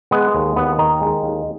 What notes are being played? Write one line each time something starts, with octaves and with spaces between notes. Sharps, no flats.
G#3 B3
D#2
D#2 B3
D#3 D#4
G#3
D#2